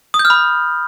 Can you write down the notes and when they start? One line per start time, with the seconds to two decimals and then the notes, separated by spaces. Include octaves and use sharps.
0.14 D#6
0.19 G6
0.25 F6
0.30 B5